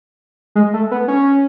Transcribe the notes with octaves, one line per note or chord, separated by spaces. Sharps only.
G#3
A3
B3
C#4